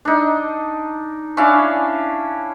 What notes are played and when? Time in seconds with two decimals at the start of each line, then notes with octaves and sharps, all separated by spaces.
0.05 D4 D#4
1.37 C#4 D4 E4 F5